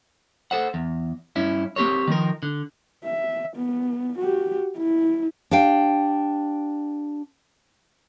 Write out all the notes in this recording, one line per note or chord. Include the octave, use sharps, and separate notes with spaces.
A4 C5 F#5
E2
G2 C#4 E4
A#3 C4 G4 A#4 C#5
D#3 F3 A#4
D3
E5
B3
F#4 G4
E4
D4 G4 F5 G5